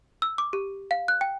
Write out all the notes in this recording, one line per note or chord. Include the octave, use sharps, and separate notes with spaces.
E6
D6
G4
F5
F#6
G5